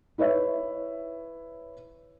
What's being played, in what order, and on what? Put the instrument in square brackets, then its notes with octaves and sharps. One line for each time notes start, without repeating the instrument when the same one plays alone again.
[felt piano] E4 B4 C#5 E5